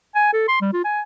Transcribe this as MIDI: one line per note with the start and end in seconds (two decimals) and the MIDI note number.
0.15 0.32 80
0.33 0.47 69
0.48 0.58 84
0.61 0.73 55
0.73 0.84 65
0.84 1.01 80